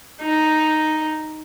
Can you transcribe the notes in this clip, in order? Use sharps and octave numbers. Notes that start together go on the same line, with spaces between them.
D#4